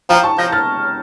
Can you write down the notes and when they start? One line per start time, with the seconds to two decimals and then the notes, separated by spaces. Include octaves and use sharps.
0.09 F3 G5 A#5
0.24 A5 C#6
0.38 F3 G6 A#6
0.52 F6 A6